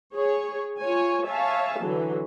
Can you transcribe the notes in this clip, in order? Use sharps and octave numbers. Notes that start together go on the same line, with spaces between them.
G#4 C#5
F4 C#5 G#5
C#5 E5 F5 G#5 A5
D3 E3 F#3